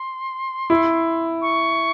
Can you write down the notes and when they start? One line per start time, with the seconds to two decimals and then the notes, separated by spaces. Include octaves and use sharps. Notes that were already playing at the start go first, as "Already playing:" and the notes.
Already playing: C6
0.70 E4
1.42 C#6